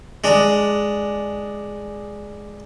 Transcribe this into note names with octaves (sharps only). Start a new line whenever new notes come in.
G#3 D4